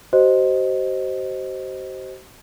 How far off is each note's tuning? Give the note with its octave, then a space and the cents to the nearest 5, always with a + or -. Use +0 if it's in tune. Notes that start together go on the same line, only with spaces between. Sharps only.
F#4 +45 C5 +0 D#5 +0